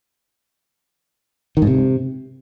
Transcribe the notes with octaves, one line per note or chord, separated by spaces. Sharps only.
D#3
G#2
C3